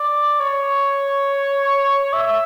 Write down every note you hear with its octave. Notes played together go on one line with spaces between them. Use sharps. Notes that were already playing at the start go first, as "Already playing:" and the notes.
Already playing: D5
C#5
E5